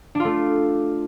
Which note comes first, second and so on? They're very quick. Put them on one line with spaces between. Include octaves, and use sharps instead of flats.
D4 F4 A3